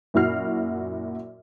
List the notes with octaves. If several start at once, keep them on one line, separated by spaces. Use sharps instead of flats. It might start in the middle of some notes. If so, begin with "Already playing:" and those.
F#2 A#2 E4 F#4 F6 C7